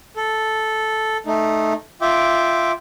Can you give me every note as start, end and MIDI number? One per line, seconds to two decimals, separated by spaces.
0.17 1.17 69
1.26 1.74 57
1.26 1.74 63
2.01 2.72 65
2.01 2.72 76
2.01 2.72 79
2.01 2.72 86